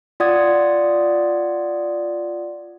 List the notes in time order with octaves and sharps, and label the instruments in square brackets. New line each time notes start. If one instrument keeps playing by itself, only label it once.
[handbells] F4 D5 F#5 D#6 G#6